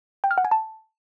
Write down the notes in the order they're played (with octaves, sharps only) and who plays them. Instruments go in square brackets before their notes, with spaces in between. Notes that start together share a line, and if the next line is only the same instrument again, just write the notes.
[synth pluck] G5
F6
F#5
G#5
A5